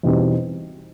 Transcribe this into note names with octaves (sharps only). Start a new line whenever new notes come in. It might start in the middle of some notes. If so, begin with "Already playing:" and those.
E2 B2 G3 C4 D#4